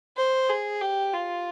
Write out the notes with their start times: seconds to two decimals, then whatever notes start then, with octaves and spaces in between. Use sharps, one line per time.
0.17 C5
0.49 G#4
0.81 G4
1.13 F4